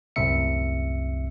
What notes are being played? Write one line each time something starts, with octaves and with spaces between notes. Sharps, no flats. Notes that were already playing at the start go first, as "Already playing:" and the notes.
C2 F#2 A2 C3 E5 C#7